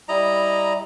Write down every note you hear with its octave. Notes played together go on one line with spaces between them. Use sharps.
G3 E4 D#5 A#5